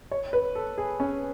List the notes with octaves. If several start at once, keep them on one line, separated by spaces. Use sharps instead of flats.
C#5
B4
A4
G#4
C#4